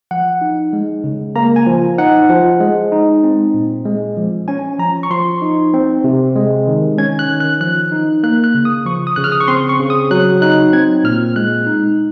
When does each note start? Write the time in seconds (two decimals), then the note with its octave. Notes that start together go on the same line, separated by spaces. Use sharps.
0.11 F3 F#5
0.41 D#4
0.73 G#3
1.04 C#3
1.36 A#3 A#5
1.56 G#5
1.67 F3
1.98 D#4 F#5
2.29 F3
2.60 G#3
2.92 D#4
3.23 C4
3.54 A#2
3.86 G#3
4.17 F3
4.48 C#4 G#5
4.79 F3 A#5
5.03 C#6
5.11 F3 C6
5.42 D#4
5.74 C4
6.04 C3
6.35 G#3
6.68 D#3
6.98 C#4 G#6
7.19 F#6
7.30 D#3
7.40 F#6
7.61 F3 F#6
7.92 D#4
8.23 A#3 F#6
8.44 F#6
8.55 C#3
8.65 D#6
8.86 F3 C#6
9.07 D#6
9.16 C#3 F#6
9.24 F6
9.32 D#6
9.41 C#6
9.48 C4 C6
9.69 C#6
9.79 C#3
9.90 D#6
10.11 F#3 F#6
10.42 D#4 F#6
10.73 C4 G#6
11.04 A#2 F6
11.36 G#3 F#6
11.67 D#4